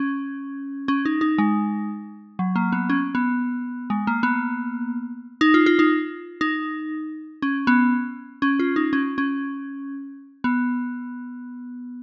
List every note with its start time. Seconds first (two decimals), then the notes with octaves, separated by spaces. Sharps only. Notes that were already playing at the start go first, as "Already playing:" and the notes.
Already playing: C#4
0.88 C#4
1.05 D#4
1.21 D#4
1.38 G#3
2.39 F#3
2.56 A#3
2.72 B3
2.90 C#4
3.15 B3
3.90 G#3
4.07 A#3
4.23 B3
5.41 D#4
5.54 F4
5.66 F4
5.79 D#4
6.41 D#4
7.42 C#4
7.67 B3
8.42 C#4
8.59 F4
8.76 D#4
8.93 C#4
9.18 C#4
10.44 B3